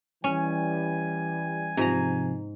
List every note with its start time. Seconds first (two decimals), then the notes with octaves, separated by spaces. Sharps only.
0.24 E3 G3 C#4 G#5
1.77 G#2 C3 F3 A#5